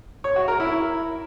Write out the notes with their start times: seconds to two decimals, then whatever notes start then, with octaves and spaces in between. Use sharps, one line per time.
0.24 C#5
0.36 F#4
0.48 A#4
0.60 E4